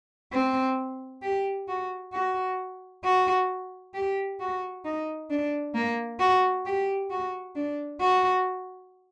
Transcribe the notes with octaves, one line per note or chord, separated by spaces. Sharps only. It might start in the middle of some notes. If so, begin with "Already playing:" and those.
C4
G4
F#4
F#4
F#4
G4
F#4
D#4
D4
A#3
F#4
G4
F#4
D4
F#4